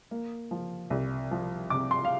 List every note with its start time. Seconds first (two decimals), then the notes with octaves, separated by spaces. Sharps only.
0.11 A#3
0.51 F3
0.90 C2
1.31 F3
1.70 C3 D6
1.91 C6
2.05 F5